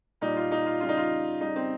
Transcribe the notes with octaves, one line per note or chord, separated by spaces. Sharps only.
A#2 G3 D#4
F4
D#4
F4
C#3 G3 F4
D#4
F4
C#3 G3 D#4
C4